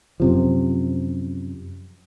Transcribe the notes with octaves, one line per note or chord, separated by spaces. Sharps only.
F#2 C3 F3